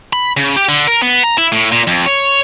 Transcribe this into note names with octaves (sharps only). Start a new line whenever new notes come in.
B5
C#3
G4
D3
A#4
B3
A#5
E4
A2
A#2
F2
C#5